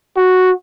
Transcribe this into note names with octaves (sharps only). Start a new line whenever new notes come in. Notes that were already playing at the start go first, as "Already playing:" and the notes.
F#4